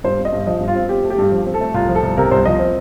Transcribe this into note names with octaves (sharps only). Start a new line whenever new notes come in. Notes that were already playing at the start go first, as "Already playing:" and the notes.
G2 C5
C4
D#5
G2
F3 D#5
G2
F4
C4
C4 G4
A3
G4
G2
F3
C4
A4
A3
C2 F4
F3
A4
C2
C3 A#4
C2 C5
F3 D#5
C4